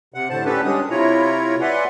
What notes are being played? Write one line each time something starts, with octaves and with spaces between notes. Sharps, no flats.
C3 F#5
A2 D3 C5 A5
B3 C#4 D4 G4 A4 B4
G3 G#3 C#4 D4 D#6
C3 E4 F4 C#5 A#5
B4 D5 E5 F#5 G#5 C6